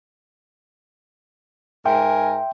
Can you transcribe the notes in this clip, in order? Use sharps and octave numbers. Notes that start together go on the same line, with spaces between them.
G#2 A#4 E5 G5 G#5 C6